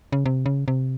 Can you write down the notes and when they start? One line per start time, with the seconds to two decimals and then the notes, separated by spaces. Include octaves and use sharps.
0.12 C#3
0.26 C3
0.46 C#3
0.68 C3